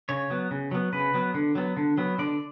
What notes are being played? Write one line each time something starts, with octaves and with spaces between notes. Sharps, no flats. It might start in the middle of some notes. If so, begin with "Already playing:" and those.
C#3 C#5
F#3 B3
C#3
F#3 B3
C#3 B4
F#3 B3
D3
F#3 B3
D3
F#3 B3
D3 D5